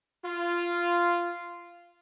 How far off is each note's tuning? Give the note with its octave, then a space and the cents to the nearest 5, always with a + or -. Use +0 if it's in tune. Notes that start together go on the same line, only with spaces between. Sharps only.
F4 -10